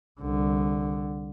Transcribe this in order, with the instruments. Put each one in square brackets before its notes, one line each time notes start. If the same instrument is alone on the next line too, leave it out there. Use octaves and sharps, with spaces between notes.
[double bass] C2 D3